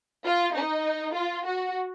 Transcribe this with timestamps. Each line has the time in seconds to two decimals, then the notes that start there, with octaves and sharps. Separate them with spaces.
0.25 F4
0.55 D#4
1.15 F4
1.46 F#4